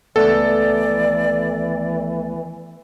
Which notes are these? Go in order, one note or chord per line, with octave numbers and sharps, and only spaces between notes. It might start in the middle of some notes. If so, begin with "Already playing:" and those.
C#2 E3 A3 B3 A4 D5